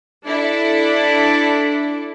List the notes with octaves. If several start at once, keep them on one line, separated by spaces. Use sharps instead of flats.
D4 E4 A4